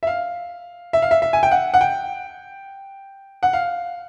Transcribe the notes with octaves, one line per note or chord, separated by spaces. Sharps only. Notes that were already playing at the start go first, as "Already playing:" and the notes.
E5
F5
E5
F5
E5
E5
G#5
G5
F#5
F#5
G5
F#5
F5